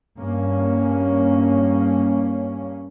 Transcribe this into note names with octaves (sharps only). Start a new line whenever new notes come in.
G2 A#3 C#4